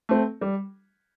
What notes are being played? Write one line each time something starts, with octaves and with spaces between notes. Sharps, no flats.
A3 C4
G3